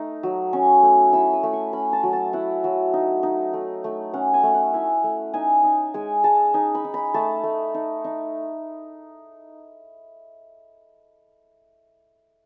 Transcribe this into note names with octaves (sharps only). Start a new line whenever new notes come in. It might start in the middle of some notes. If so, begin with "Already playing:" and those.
Already playing: A3 D#4
F#3
C#4 C#6
A3
E4 E6
D#6
A3
C#6
C#4 B5
A5
F#3
A5
E4 F#5
F#3
D#4
D#4
A3
A3
C#4 F#5
G#5
A3
F#5
E4 G#5
A3
D#4 G#5
D#4
G#3 G#5
G#3 A5
D#4 G#5
B5
D#4
B5
A3 A5
A3
D#4
D#4